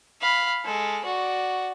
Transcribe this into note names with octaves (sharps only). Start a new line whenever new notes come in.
F5 B5
G#3 A4
F#4 D5